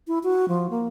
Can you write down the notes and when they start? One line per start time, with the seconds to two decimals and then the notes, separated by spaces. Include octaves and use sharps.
0.08 E4
0.24 F#4
0.48 F3
0.70 A#3